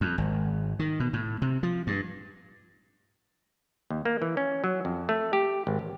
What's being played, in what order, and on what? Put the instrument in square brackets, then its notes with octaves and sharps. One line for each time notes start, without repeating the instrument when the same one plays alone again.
[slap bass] F2
G#1
D#3
B2
A2
C3
F3
G2
[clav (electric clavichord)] D#2
A#3
E3
C#4
F#3
F2
A3
G4
G#1
A1